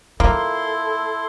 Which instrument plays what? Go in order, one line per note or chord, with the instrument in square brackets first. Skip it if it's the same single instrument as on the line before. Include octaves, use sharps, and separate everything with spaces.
[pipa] A#3 [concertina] E4 C6 [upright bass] F4 [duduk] A4